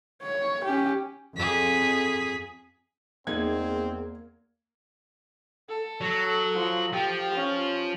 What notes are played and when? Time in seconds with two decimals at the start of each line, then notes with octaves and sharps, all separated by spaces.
0.22 C#5
0.65 C#4 G4
1.36 F2 G#4 B6
3.27 E2 F3 G#3 A#3 C4 D#4 G#6
5.69 A4
6.01 F#3
6.55 F3
6.93 F3 G4
7.35 C#4